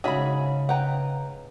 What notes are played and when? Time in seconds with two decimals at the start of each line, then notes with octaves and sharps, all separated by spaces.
0.04 G#2 C#3 C#4 F#4 G#4 E5 B5
0.69 B4 F#5 G5 A#5